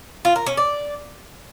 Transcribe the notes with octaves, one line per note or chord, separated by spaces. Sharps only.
F4
A#4
C#4
D5